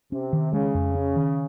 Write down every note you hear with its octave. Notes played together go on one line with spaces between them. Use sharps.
C3 C#4
D#3
C#3 G#3
F2
C#4
D#3